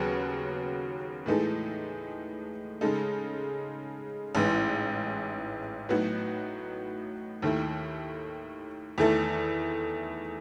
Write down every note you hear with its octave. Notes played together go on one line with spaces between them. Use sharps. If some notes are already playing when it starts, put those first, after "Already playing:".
Already playing: D#2 C#3 F#3 B3 F#4
A2 E3 G#3 D#4 A4
C#3 G#3 D#4 A4
A1 G#2 E3
A2 F#3 B3 D#4 F#4
D#2 D#3 A3 E4
E2 D#3 A3 E4 A4